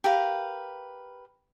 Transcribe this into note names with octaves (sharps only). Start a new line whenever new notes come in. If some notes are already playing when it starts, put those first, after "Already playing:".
G4 A#4 B4 F5